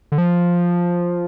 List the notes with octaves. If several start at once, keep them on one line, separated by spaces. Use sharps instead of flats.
D3
F3